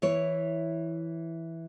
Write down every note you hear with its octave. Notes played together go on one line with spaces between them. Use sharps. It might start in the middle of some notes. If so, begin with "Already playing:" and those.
E3 E4 C#5